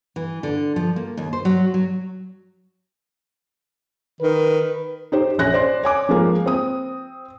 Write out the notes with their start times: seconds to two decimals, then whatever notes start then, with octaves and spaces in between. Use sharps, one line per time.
0.16 E3
0.43 D3
0.76 F3
0.96 A#3
1.17 D#2
1.33 C5
1.45 F#3
1.74 F#3
4.21 D#3 B4
5.12 D#4 G4 C5
5.38 A#1 C#4 F#6 A#6
5.54 C5 D5 C6
5.83 C#5 G#5 D6
6.09 F3 G#3 A#3
6.46 C4 D#6